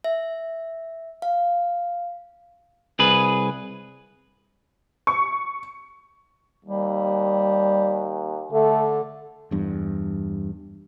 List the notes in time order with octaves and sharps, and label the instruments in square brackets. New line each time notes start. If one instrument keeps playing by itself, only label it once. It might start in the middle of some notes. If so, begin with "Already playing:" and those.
[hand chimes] E5
F5
[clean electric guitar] C2 G#4 B4
[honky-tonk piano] C#6
[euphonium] D#2 [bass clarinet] G3
[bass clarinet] D3 [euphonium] A3
[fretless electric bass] E2 G2